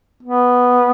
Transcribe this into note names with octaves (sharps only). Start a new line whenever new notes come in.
B3